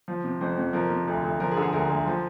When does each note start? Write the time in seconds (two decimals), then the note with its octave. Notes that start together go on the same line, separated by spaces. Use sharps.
0.08 F3
0.24 C3
0.41 F2 C5
0.57 F2
0.73 F3 A#4
0.90 C3
1.07 D2
1.23 D2
1.40 F3 A#4
1.51 G#4
1.57 D3
1.63 G#4
1.73 D2 A#4
1.89 D2
2.07 F3